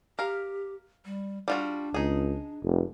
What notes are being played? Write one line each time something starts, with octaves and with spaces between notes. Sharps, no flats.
G4 A#4 F5
G3
G3 D4 F4 F#4
C#2 D#4 G#4
F1